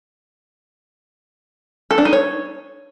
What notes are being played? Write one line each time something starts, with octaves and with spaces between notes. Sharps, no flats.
A4
D4
D#4
C#5